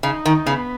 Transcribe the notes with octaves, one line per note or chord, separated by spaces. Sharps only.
C#3 D#4
D#3
C#3 B3